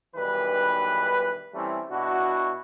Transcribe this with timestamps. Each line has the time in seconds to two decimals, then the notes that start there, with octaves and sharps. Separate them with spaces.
0.15 B1 D#3 E3 G3 B4
1.54 E3 G3 A3 C4 C#4 E4
1.91 B2 D4 E4 F#4